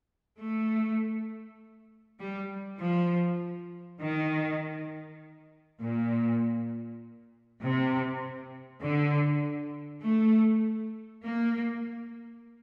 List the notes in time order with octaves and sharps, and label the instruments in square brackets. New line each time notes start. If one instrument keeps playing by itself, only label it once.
[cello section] A3
G3
F3
D#3
A#2
C3
D3
A3
A#3